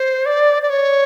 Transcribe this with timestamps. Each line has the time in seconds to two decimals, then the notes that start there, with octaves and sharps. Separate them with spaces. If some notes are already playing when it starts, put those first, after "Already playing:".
Already playing: C5
0.26 D5
0.63 D5
0.70 C#5